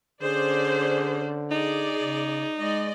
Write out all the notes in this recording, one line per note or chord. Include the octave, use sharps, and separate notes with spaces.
D3 C#4 G#4 C5 D5
D#4 G#4 D5
C#3
G#3 D5 D#5